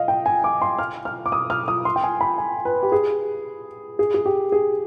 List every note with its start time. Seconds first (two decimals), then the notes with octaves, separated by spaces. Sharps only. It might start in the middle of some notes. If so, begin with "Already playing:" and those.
Already playing: D#5 F5
0.08 G5
0.26 G#5
0.44 D6
0.61 C6
0.79 F6
1.05 F6
1.26 D6
1.32 D#6
1.50 F6
1.68 D#6
1.85 C6
1.96 G5
2.04 G#5
2.21 B5
2.38 G#5
2.65 B4
2.83 G4
2.92 G#4
3.99 G#4
4.14 G#4
4.26 G4
4.52 G#4